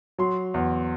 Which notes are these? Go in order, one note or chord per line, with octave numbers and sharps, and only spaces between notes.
F#3 C6
E2